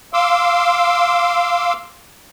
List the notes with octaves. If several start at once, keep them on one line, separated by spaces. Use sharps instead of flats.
F5 C6 D6 E6